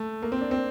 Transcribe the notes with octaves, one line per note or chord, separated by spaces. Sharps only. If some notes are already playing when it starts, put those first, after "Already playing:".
Already playing: A3
A#3
C4
D4
C4